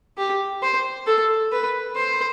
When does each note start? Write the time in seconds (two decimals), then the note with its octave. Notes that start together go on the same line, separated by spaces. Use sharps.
0.18 G4
0.62 C5
1.07 A4
1.52 B4
1.96 C5